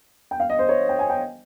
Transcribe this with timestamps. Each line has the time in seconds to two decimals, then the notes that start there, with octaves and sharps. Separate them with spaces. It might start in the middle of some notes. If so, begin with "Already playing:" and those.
0.31 G5
0.40 F5
0.50 D#5
0.59 C5
0.69 C#5
0.89 G5
0.99 G#5
1.10 G5